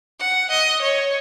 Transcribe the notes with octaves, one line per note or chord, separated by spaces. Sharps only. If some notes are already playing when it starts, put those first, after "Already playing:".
F#5
D#5
C#5